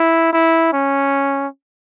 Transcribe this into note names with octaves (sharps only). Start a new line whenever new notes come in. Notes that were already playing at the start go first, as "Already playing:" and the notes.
Already playing: E4
E4
C#4